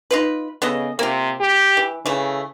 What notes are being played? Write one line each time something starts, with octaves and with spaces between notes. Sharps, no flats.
D#4 F4 B4
C#3 B3 A4 D#5
C3 A#3 F4
G4
E3
C#3 E3 A3